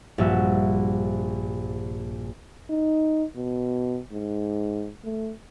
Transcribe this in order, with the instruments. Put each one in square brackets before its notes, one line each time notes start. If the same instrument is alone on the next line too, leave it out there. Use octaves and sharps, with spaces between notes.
[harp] A#1 G2 C3 F#4 E5
[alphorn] D#4
B2
G#2
A3